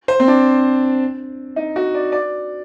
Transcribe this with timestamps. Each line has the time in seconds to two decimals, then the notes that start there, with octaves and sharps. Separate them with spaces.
0.08 C5
0.20 C4
0.28 D4
1.56 D#4
1.76 F#4
1.95 D5
2.12 D5